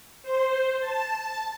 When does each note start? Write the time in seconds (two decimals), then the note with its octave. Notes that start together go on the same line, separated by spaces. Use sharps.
0.23 C5
0.80 A5